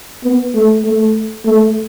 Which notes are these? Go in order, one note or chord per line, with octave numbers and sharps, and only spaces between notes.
B3
A3
A3
A3